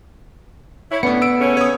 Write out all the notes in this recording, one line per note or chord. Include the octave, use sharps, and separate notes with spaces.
E4 C#5
A2 D3 B3 C#4 C#7
E6 D7
C#3 A3 C#4
C#5 D#6